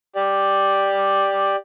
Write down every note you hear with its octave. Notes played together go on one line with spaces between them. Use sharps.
G4 D5